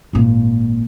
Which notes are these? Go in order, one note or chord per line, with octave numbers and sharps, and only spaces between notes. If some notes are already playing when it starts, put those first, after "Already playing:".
G#1 A#2